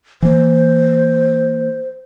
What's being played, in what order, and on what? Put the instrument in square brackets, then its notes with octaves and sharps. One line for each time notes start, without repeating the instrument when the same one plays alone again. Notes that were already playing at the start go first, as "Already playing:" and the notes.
[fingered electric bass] E3 A#3 [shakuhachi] C5